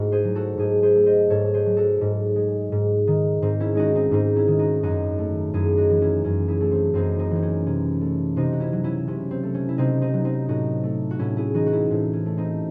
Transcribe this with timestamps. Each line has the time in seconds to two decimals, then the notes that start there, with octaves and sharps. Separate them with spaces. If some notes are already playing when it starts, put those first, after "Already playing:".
Already playing: G#2 A3 E4 F#4
0.12 G#4 C5
0.24 F#3
0.35 F#4 A4
0.58 G#2 G#4 C5
0.82 G#4 C5
0.95 A3
1.06 C5 D#5
1.30 G#2 A4 C#5
1.45 A4
1.54 G#4 C5
1.66 F#3
1.77 F#4 A4
2.01 G#2
2.36 G#3
2.72 G#2
3.07 D#3
3.42 G#2 C4 D#4
3.60 C#4 E4
3.75 G#3 D#4 F#4
3.95 C4 D#4
4.11 G#2 C4 D#4
4.36 C#4 E4
4.48 D#3
4.59 D#4 F#4
4.83 F#2 D#4 F#4
5.19 A3
5.54 F#2 E4 G#4
5.77 D#4 F#4
5.90 E3
6.02 C#4 E4
6.24 F#2 C#4
6.48 E4 G#4
6.61 A3
6.71 C4
6.94 F#2 C4 D#4
7.19 C4 D#4
7.31 E3 C4
7.43 C#4
7.66 C3 C#4
8.01 A3
8.36 C3 C4 D#4
8.53 F#4
8.60 C#4 E4
8.73 F#3
8.84 C#4 E4
9.07 C3 C#4
9.31 C4
9.43 A3
9.54 C#4
9.69 E4
9.78 C3 C4 D#4
10.01 C4 D#4
10.14 F#3
10.25 C4 D#4
10.48 A2 D#4 F#4
10.84 A3
11.11 F#4
11.19 A2 C#4 E4
11.37 E4 G#4
11.54 E3 D#4 F#4
11.66 F#4
11.72 C#4 E4
11.90 A2 C4
12.13 C#4
12.26 A3
12.37 C4 D#4